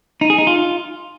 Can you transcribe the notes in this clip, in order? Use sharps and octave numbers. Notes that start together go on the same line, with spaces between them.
D#4
G#4
D#4
F4